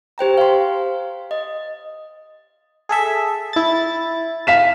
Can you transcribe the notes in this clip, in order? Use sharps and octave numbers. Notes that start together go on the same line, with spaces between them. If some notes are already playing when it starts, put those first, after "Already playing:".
G4 C5 G5 A#5
F5 C6
D#5
G#4 A4 E5
E4 A6
F5 B6 E7